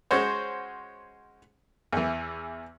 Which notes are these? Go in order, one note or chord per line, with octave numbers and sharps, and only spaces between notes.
G#3 C#4 F#4 C5 C#5
E2 E3